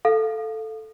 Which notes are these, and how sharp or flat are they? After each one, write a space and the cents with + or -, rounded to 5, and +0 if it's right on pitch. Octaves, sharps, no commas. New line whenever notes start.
A4 +0 F5 +0